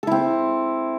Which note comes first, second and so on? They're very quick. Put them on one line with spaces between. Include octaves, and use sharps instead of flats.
A4 E4 C4